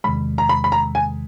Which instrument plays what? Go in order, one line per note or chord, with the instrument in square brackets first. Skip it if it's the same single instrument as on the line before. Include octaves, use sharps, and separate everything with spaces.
[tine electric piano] E2 C3 D#3 G#3 [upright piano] B5
[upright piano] A#5
B5
B5
A#5
G#5